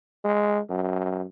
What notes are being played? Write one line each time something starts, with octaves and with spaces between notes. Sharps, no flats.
G#3
F#2